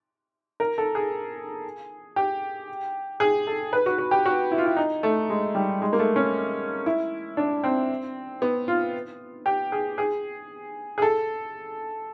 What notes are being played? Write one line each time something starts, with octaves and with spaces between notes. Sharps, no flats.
A#4
A4
G#4
G4
G#4
A4
B4
F#4
F#4
G4
F#4
E4
F4
E4
D#4
A3
G#3
G3
G#3
A#3
A3
C#4
E4
D4
C4
B3
F4
G4
G#4
G#4
G#4
A4